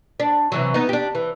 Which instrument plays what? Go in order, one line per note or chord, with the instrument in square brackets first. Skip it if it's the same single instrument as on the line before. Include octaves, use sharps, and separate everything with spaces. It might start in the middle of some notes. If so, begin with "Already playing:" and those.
[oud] D4
C3 E3 F#3
B3 D#4
D4 G4
E3